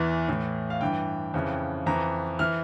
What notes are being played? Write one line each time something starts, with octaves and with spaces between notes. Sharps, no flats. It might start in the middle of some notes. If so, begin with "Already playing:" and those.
Already playing: E2 E3
A2 E3
F5
G2 E3 G5
F2 C#3 E3
F2 E3 A#5
E3 F6